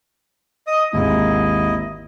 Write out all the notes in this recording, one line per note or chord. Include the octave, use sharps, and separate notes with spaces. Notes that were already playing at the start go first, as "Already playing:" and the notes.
D#5 D#6
G#1 D#2 G#2 E4 D#5